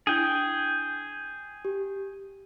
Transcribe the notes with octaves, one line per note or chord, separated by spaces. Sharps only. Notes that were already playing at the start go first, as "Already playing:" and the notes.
D4 E4 G#4 G5
G4